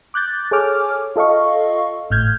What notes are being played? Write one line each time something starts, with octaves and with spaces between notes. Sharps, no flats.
D6 F#6 G6 A6
G#4 A4 C#5 G#5 D6 F6
F4 A4 D#5 F5 C#6
G#1 A2 F6 G6 G#6